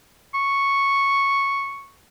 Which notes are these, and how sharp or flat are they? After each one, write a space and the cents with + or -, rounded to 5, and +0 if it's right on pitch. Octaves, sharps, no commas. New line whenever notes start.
C#6 -5